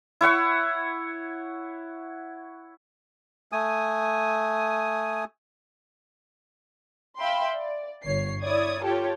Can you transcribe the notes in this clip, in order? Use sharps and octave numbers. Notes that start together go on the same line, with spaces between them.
E4 C#5 F#5 C#6
A3 G#5 D#6
E5 F5 G5 B5 C6
D5
G1 C#5 C7
E4 C#5 D5 D#6 G#6
F4 G4 A4 C#5 G5